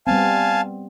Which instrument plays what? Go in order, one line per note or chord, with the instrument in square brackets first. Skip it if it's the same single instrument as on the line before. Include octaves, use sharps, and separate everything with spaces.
[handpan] G3 B3 C4 [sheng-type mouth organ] F5 G#5 A5